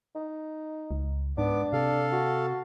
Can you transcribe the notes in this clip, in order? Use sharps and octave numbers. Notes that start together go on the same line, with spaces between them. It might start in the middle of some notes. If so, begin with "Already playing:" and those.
D#4
C#2
G#2 B3 D4 D6
C3 A4 F5
F#4